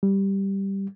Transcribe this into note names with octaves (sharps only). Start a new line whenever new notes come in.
G3